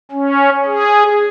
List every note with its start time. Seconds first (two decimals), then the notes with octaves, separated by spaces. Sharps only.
0.11 C#4
0.66 G#4